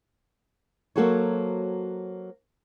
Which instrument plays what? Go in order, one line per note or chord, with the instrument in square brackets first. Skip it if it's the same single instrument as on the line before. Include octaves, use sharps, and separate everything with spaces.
[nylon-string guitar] F#3 A#3 F#4 A4 C5 C#5